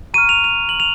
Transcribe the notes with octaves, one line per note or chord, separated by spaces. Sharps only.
A#5 C#6 F6 D#7
F7
F7
F#7
F7